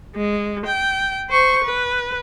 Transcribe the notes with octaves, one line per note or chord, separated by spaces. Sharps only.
G#3
G5
C5 C#6
B4